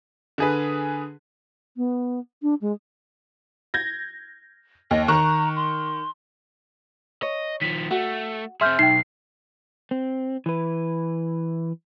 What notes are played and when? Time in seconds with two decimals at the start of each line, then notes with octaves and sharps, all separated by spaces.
0.38 D3 G#4 B4
1.77 B3
2.42 D4
2.61 G#3
3.74 G6 G#6 A#6
4.91 D#2 D#5
5.08 D#3 A#5 C#6 F#6
5.56 C6
7.23 C#5 D#5
7.61 D#3 F3 B6
7.91 A3 F#4
8.61 C4 G#4 E5 C6 F6 G6
8.79 B1 D#4 G5 C7
9.91 C4
10.46 E3 B4